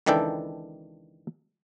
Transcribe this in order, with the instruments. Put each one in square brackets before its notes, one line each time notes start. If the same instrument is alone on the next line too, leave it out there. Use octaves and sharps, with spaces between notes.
[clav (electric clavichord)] C#2 D#3 E3 D4 A4 G5